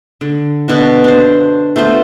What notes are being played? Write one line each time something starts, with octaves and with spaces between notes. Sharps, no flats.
D3
B2 D4 F#4
D4 C5
A3 B3 F4 C5